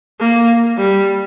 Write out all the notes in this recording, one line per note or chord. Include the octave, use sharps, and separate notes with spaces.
A#3
G3